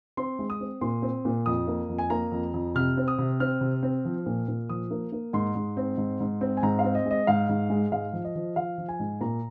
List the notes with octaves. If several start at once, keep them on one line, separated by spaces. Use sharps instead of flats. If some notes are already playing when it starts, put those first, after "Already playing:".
C4 C6
G#3
D#6
C4
A#2 C6
C4
A#2
F2 D#6
A#3
F2
G#5
A#3 A#5
F2
F2
C3 F6
C4
D#6
C3
C4 F6
C3
C4
F3
A#2
A#2
F3 D#6
A#3
A#3
G#2 C6
G#2
C4
G#2
G#2
C4
G#5
G#2 A#5
F5
C4
D#5
G#3
D#5
G#2 F5
G#2
G#3
G#2 F5
F3
D#5
F3
F3 F5
F3
G#5
G#2
A#2 A#5